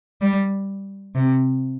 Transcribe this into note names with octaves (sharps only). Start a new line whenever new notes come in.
G3
C3